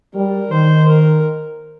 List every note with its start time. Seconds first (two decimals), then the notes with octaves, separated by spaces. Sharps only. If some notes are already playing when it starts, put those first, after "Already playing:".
0.14 G3 A#4
0.51 D#3 C5
0.89 A#4